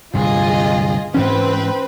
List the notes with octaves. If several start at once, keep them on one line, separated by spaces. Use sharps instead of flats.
D1 G2 C3 F4 G#4 D#5
G#2 E3 C4 C#4 B4